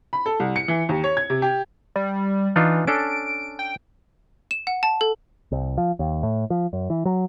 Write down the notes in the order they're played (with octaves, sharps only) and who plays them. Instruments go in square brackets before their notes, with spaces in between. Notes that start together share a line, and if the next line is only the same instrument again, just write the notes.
[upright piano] B5
A4
C2
C#7
E3
D#2
C#5
G#6
C3
G4
[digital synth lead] G3
[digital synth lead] E3 [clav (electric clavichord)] D4 D#4 F4
[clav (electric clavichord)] C#4 D4 A4 [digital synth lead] D7
[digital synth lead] G5
[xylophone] E7
F#5
A5
A4
[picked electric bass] C2
F3
D#2
A2
F3
F#2
E3
F#3